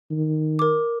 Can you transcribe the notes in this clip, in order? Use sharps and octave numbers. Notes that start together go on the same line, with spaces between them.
D#3
A#4 D6